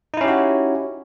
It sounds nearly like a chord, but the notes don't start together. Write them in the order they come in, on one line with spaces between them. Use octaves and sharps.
D#4 E4 C#4 G4 F#4